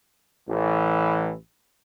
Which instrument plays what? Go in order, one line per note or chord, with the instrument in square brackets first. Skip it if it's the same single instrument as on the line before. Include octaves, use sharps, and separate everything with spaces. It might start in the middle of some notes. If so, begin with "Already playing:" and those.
[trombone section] A1 E3